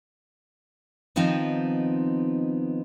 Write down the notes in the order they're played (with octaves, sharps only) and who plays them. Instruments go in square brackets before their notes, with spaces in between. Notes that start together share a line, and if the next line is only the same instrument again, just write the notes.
[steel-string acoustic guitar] D#3 F3 B3 C4 D#4